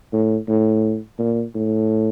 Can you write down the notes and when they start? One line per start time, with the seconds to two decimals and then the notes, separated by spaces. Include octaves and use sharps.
0.13 A2
0.48 A2
1.19 A#2
1.55 A2